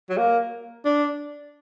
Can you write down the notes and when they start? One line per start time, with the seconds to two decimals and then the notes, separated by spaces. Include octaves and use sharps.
0.10 F#3
0.18 A#3
0.85 D4